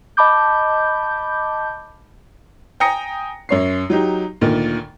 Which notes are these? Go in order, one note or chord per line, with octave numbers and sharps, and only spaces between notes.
D#5 A5 B5 D6 G6
G5 G#5 A#5 D#6 A#6 C#7
F#2 C#5 C7
F#3 D#4 G4
D2 A#2 D#3